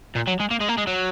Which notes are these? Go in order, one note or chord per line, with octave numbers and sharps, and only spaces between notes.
A#2
F#3
G#3
A#3
G#3
A#3
G#3
F#3